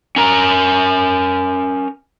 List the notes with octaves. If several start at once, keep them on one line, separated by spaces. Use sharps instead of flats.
C#4 A#4 A#5